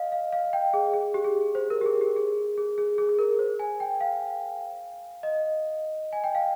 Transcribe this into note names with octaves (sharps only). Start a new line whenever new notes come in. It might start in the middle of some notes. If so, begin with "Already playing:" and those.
Already playing: D#5 F5
F5
F5
G5
G#4
G#4
G4
G#4
C5
A#4
G4
G#4
G4
G#4
G#4
G#4
G#4
G#4
A#4
C5
G#5
G5
F5
D#5
G#5
G5
F5